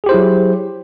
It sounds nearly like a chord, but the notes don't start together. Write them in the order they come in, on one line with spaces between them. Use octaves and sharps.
G#4 G4 C5 E4 F#3